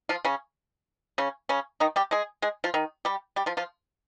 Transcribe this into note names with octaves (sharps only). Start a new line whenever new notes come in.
F3 F4
C#3 C#4
C#3 C#4
C#3 C#4
D#3 D#4
G3 G4
G#3 G#4
G#3 G#4
F3 F4
D#3 D#4
G3 G4
G3 G4
F3 F4
F3 F4